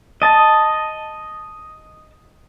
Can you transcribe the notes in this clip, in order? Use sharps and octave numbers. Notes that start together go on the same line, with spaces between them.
D#5 A5